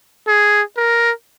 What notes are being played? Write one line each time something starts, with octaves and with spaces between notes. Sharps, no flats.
G#4
A#4